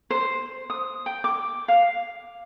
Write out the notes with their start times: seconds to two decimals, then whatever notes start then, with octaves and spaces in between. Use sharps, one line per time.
0.10 C5
0.70 D#6
1.06 G5
1.24 D6
1.68 F5